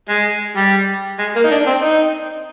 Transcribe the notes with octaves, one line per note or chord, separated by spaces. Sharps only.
G#3
G3
G#3
A#3
D#4
D4
C4
D#4